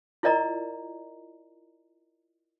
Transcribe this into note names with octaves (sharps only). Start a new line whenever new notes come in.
E4 F4 A#4 D5 D#5 A#5